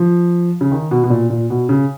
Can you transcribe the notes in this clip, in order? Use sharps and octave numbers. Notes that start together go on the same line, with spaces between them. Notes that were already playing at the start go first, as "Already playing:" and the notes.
Already playing: F3
C#3
D#3
B2
B2
A#2
A#2
B2
C#3